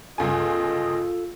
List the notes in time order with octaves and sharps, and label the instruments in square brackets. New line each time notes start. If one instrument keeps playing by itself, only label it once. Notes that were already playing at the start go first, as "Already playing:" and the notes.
[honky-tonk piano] G1 C#2 G#5 [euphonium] F4 [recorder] A4 [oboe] D#5